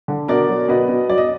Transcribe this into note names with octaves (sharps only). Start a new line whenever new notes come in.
D3
B2 A#4 D5
F#3
B2 B4 D#5
B2
F#3 D5
D#5